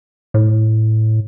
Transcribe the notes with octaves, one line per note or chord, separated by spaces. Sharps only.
A2